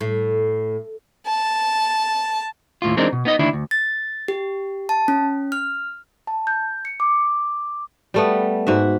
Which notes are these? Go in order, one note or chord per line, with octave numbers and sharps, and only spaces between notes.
A2
A5
D#2 A2 F4
E3 G#3 C4 D4 D#4 A#4
B2
B3 D#4 D#5
D2 D#3 D4 E4
D2
A6
G4
A5
C#4
F6
A5
G6
C#7
D6
G3 A3 B3
G#2 F#4 E5